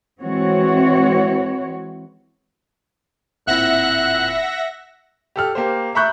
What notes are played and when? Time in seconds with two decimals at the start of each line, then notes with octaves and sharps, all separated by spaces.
0.22 E3 G#3 C4 F#4 C#5
3.47 D1 A#2 C4 E4 E5 F#5 F#6 A#6
5.36 G4 A4 F6
5.55 A#3 G4 C5
5.95 E5 A#5 B5 C#6 F#6 G6